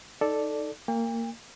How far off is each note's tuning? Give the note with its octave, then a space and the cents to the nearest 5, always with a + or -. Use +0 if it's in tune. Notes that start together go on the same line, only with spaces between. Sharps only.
D#4 +0 A4 +0 D5 +0
A#3 -20 G5 +40